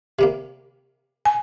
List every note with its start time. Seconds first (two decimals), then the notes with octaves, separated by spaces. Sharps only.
0.19 C3 G3 A#3
1.25 G#5